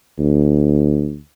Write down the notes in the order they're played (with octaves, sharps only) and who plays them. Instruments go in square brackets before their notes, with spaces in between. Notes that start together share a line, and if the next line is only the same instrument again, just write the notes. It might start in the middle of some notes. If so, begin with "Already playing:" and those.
[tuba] D2